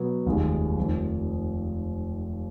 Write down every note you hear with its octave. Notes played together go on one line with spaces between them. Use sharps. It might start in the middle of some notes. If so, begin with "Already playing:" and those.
Already playing: B2 F#3 B3
F1 D#2 D#3 G#3
F1 F2 D#3